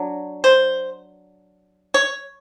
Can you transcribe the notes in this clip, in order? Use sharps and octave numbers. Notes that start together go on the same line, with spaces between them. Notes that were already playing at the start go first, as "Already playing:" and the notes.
Already playing: F#3 D4
C5
C#5